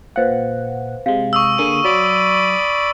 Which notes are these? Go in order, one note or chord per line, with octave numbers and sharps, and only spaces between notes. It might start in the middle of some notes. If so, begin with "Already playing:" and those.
A#2 B4 C5 F5 F#5
C3 G#3 F5
C#6 D#6 E6
D3 A#3 G#4 D#7
F#3 D5 B5